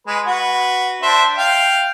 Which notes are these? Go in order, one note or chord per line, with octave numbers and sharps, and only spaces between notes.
G#3 B4
F#4 B4
D4 C5 E5
F5 G5